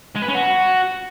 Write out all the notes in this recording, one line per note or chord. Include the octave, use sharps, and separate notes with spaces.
G#3
B4
C#4
F#4